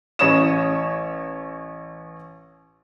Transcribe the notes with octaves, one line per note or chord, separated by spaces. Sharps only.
A1 C#5 D#6 E7